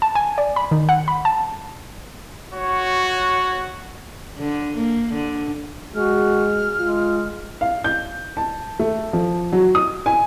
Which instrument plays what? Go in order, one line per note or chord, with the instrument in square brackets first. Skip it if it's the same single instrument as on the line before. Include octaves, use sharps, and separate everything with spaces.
[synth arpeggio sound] A5
G#5
D5
B5
D#3
F#5
B5
A5
[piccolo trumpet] F#4 [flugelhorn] C#5
[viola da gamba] D3
A#3
D3
[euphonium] G#3 [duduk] F#4 [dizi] F6
[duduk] G#3 [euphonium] F4
[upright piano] F5
G6
A5
A3
F3
F#3
D#6
G#5